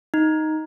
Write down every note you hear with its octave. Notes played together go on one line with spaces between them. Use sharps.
D#4